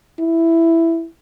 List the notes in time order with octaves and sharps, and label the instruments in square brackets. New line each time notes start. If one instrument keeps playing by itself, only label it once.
[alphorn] E4